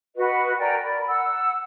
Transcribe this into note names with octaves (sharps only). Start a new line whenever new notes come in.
F#4 B4 D#5
A#4 D5 G5 G#5
A#4 D5 B5
F#5 E6